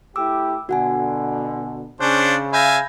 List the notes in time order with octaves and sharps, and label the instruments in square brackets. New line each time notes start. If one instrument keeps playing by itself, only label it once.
[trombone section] A3 E4 G4 [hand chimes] D6 E6
[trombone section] B2 D3 [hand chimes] F#4 F#5 G#5
[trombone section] C#3 [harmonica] C#4 D4 C5 [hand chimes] F#6
[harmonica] E5 F5 G#5 [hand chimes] B5 G6 A#6